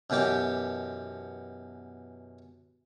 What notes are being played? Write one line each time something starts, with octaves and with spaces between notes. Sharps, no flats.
F#2 B2 E3 G4 D6